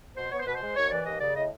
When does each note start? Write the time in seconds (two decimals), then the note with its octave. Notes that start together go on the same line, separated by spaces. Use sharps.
0.17 B2 C5
0.31 B3 C#5
0.39 C5
0.46 B2 B4
0.55 C5
0.61 G#3
0.76 D#2 C#5
0.90 E3 D5
1.05 D#2 D#5
1.20 C#3 D5
1.35 A2 D#5